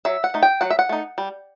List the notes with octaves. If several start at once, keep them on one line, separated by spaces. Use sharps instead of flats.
F#3 E5
F#5
A3 D#4
G5
F#3 F#5
E5
F#5
A3 D#4
G3